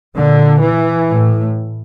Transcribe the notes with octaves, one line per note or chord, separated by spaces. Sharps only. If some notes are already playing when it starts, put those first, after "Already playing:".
A#2 D3
E3
A2